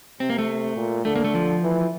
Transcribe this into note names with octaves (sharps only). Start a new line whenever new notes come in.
C3 C4
A#3
A3
A#2
D3 A3
A#3
A3
F3
E3